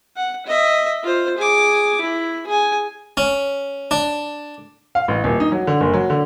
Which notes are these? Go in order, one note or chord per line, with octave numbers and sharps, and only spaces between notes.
F#5
D#5 E5
F4 C5
G#4 D6
E4
G#4 G#5
C#4
D4
F5
A1
D#1
D#4
F#3
D3
F#1
F#3
D3